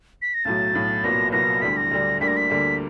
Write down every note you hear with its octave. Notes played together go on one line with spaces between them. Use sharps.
B6
A#6
B1 A2 F#3 A6
B1 A2 F#3
C2 A#2 F#3 B3 A#6
C2 A#2 F#3 B3 A#6
D2 D3 G3 B6
A#6
D2 D3 G3
D2 D3 G3 A#3 B6
A#6
B6
D2 D3 G3 A#3